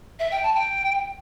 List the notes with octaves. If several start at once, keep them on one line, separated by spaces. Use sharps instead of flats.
E5
G5
A5
G5